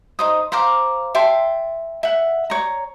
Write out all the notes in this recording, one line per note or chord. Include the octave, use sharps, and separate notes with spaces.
D#4 C5 D#6
C5 F5 A#5 D6
E5 G5 A5 C6
E5 F#5
C#5 A#5